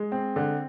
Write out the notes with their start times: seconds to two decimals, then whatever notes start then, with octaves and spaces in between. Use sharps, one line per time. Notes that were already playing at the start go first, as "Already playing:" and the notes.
Already playing: G#3
0.12 C4
0.36 D3